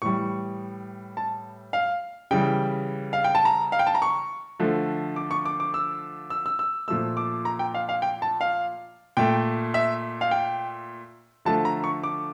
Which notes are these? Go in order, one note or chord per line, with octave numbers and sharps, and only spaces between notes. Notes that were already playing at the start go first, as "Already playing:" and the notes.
A2 E3 G3 C#6
A5
F5
C#3 E3 G3 G5
F5
G5
A5
A#5
F5
G5
A5
A#5
C#6
D3 F3 A3
D6
C#6
D6
D6
E6
E6
E6
E6
A#2 F3 A3 E6
D6
A#5
G5
F5
F5
G5
A5
F5
A#2 A3 G5
E5
F5
G5
D3 F3 A3 A5
A#5
C#6
D6